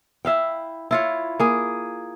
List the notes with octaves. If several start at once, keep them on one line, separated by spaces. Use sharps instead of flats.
E4 E5 F5 G5
E4 F4 C#5
A#3 G#4